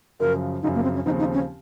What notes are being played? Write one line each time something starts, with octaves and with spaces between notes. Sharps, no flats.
F#2 C#3 F3 A#4
F#2 C#3 F3 D#4
A#3
C4
C#4
D#2 C#3 F3 C4 D#4
D#4
C#4